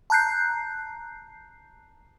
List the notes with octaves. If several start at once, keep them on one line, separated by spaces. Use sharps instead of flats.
A5 A#5 F#6 G6 C7